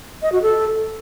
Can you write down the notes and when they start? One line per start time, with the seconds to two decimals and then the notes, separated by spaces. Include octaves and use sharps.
0.22 D#5
0.32 F#4
0.42 A4